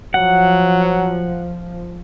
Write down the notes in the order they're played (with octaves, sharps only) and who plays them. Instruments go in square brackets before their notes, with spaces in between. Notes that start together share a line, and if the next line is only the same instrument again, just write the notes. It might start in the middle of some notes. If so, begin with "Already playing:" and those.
[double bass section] F3 [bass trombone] F#3 [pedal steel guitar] F#5